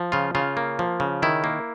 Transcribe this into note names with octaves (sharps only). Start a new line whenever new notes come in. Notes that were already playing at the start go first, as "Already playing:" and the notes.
Already playing: F3
C#3 F4
C#3 F4
A#3
F3
C#3
D#3 E4
A#3